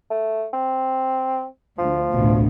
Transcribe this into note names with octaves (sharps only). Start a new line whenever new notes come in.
A3
C4
D2 F3
A1 D2 B2